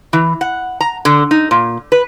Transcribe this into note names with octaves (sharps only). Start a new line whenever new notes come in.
E3
F#5
A#5
D3
D#4
A#2
B4